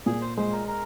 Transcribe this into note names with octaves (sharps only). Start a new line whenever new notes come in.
A#2 G#4
C5
G#3 C5
A#4
A#4